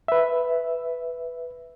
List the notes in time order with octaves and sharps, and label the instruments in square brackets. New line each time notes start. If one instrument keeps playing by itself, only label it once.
[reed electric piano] B4 E5